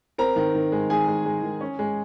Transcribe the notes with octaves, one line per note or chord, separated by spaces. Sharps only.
C4 A#4 A#5
D#3
D#3
G#3
D#3 G#4 G#5
G#3
G#3
D#3
C#4
G#3